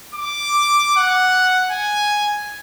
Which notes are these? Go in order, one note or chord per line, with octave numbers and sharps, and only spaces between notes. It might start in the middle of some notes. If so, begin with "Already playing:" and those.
D6
F#5
G#5